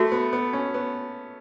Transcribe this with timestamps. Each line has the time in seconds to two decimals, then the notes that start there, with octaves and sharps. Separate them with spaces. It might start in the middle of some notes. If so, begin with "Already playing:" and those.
Already playing: A3 F#4 A4 E5
0.12 B3
0.33 B3
0.53 C#4
0.74 B3